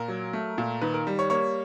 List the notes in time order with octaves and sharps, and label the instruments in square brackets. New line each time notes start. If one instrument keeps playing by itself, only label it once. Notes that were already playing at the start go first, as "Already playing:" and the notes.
Already playing: [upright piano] A#2 A#4
F#3
A3
A#2
D#3 B4
A#4
G3
C#5
A#3 C#5